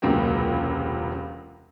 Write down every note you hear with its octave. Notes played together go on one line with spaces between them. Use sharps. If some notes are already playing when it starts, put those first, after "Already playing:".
E1 C#2 C3 F#3 A#3 G5